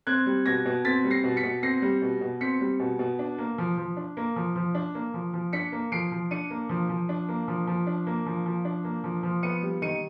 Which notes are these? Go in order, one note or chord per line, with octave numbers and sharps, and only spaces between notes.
C4 F#6 G#6
G3
B2 G#6 A#6
B2
C4 A6 B6
G3
A#6 C7
B2
B6 C#7
B2
C4 A#6 C7
G3
B2
B2
C4 B6 C#7
G3
B2
B2
D4
A#3
F3
F3
D4
A#3
F3
F3
D4
A#3
F3
F3
D4 B6 C#7
A#3
F3 C7 D7
F3
D4 C#7 D#7
A#3
F3
F3
D4
A#3
F3
F3
D4
A#3
F3
F3
D4
A#3
F3
F3
B3 C#7 D#7
G3
D#3 C#7 D#7